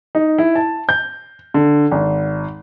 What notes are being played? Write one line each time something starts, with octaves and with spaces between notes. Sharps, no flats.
D#4
E4
A5
G6
D3
G#1